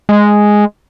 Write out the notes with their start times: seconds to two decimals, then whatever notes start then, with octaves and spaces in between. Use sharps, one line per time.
0.09 G#3